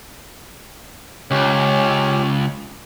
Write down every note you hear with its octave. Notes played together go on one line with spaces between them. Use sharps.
C#2 C#4 G4 C#5